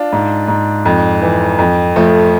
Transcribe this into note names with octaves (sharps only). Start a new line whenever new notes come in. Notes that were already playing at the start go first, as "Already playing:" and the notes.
Already playing: D4 F4
G#2
G#2
F2
E3
F2
F3 A3